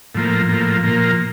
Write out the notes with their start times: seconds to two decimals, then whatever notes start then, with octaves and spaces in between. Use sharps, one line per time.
0.15 A2 F3 A#3
0.49 A2 F3 A#3
0.84 A#2 F3 A#3